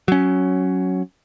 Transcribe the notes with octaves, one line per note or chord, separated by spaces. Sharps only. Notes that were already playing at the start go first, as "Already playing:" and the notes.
F#3 C#4